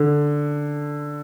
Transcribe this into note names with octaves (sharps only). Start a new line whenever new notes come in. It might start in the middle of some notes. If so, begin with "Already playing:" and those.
Already playing: D3